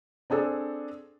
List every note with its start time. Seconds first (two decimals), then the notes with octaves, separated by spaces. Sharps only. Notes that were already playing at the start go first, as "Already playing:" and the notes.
0.30 C4 D4 G#4 A4 D5